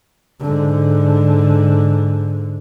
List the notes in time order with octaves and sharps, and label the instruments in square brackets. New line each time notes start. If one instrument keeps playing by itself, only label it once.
[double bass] G#2 D3